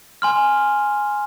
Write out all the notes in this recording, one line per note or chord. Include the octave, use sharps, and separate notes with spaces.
G#5 C6 F6